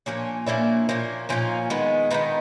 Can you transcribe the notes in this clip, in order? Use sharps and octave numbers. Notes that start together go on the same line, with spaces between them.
A#2 F3 A#3 C#4 D4
A#2 F3 A#3 C#4 D4 E4
A#2 F3 A#3 C#4
A#2 F3 A#3 C#4 D#4 F4
D#3 G#3 B3
D#3 G#3 B3 D#4 F4